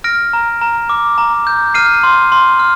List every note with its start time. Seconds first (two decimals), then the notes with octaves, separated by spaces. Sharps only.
0.04 F6 A#6 D7
0.33 A#5
0.62 A#5
0.89 D6
1.18 A#5
1.47 G6
1.74 F6 C7 D#7
2.03 C6
2.32 C6
2.59 F6